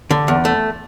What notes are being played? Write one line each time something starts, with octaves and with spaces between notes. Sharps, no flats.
D3
E2
A3